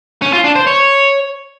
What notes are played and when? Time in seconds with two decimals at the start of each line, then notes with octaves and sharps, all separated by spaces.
0.22 C#4
0.33 F4
0.44 D4
0.55 C5
0.67 C#5